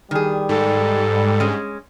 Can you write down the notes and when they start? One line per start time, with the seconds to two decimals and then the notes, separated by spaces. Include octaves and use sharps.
0.11 D#3 G3 G#4
0.49 G#2 A4
1.40 G#3 C#4